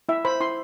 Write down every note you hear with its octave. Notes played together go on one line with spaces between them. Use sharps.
E4 E5
C5 B5
E4 C6